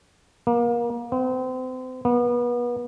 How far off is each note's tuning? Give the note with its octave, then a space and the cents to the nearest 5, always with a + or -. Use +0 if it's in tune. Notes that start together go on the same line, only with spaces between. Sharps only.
A#3 +30
C4 -35
B3 -30